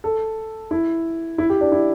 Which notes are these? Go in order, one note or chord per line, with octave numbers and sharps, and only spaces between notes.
A4
E4
E4
G4
D4
E4